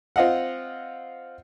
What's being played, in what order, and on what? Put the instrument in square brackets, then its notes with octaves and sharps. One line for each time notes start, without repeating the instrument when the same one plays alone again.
[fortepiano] C4 F4 D#5 F5 F#5